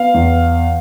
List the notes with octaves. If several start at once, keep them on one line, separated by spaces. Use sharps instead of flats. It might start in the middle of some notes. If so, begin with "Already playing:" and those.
Already playing: B3 F5
E2